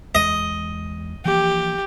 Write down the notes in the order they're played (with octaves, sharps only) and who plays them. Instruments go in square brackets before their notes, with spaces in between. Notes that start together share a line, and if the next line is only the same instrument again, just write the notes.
[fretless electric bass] E2 G#3 [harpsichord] D#5
[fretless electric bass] E3 F3 A#3 [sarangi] G4